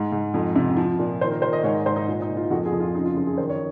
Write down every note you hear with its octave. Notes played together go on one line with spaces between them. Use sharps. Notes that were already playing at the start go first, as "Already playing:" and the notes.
Already playing: G#2
G#2
F2
C3
F3
A#2
D#3 C5
A#4
D#3 C5
D#5
G#2 C#5
G#2 C5
D#4
A#2
D#4
A#2
F4
F2 F#4
G#4
F2
F4
C#3 D#4
F4
F#2 F4
G#4
D#3 C5
C#5